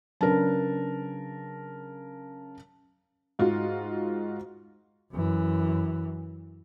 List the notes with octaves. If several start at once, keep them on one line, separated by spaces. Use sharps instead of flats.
C#3 F#3 D4 A#4 B4 A5
G#2 F4 F#4
F#2 E3